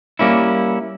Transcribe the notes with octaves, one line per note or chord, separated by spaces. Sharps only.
G3 A#3 C#4 E4